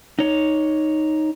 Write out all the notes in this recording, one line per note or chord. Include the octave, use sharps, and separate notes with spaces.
D#4 C#5